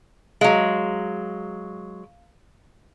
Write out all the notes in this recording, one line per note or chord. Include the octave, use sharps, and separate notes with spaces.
F#3 G#3 F5